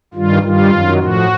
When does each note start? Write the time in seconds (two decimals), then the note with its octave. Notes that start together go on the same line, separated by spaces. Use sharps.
0.14 G2 D#3 G3 F4
0.42 G2 D#3 G3 F4
0.70 F#2 D#3 F#3
0.99 A2 F3 F#4